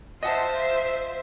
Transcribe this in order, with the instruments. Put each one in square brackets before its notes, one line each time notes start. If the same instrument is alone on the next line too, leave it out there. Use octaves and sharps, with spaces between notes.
[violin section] F4 C5 E5 [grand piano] D#5 F#5 A5